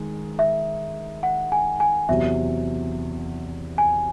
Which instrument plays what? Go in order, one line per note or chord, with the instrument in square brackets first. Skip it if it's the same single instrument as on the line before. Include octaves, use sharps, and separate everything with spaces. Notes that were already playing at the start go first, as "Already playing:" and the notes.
Already playing: [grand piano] D#3 G#3
[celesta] E5
F#5
G#5
G#5
[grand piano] E2 C3 F#3 [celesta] E5
[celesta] G#5